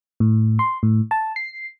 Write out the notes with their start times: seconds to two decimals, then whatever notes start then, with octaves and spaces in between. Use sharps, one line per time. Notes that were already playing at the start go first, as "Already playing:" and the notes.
0.20 A2
0.59 C6
0.83 A2
1.11 A5
1.36 C7